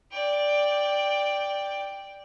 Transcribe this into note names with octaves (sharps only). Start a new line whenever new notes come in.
D5 G5